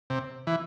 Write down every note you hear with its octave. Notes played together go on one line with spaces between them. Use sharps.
C3
E3